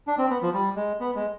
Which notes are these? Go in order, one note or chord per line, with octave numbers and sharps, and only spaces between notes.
D4
C4
B3
F3
G3
G#3
B3
G#3